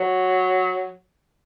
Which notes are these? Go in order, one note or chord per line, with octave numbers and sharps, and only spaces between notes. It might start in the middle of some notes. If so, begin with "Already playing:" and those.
Already playing: F#3